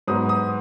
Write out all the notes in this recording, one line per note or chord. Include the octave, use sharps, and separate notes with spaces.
G#2 F#3 B3 D#6
D#6